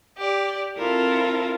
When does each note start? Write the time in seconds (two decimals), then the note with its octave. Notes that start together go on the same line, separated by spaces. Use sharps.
0.17 G4 D5
0.77 C4 E4 F4 A4 A#4